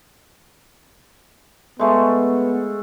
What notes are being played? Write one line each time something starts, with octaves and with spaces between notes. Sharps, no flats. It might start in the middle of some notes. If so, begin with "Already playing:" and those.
G#3 A3 B3